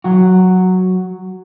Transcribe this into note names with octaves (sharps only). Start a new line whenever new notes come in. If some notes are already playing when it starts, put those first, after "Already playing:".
F#3 F#4